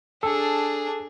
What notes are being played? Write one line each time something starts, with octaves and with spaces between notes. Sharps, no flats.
D4 G#4 A4